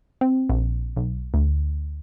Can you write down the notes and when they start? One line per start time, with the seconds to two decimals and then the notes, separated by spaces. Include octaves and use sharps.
0.21 C4
0.50 A#1
0.96 B1
1.34 D2